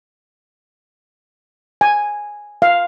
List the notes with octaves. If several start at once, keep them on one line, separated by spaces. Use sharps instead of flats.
G#5
F5